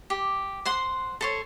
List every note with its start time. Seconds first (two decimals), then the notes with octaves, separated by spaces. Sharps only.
0.10 G4
0.65 C5 F#5 C6
1.21 A4 C5 C#5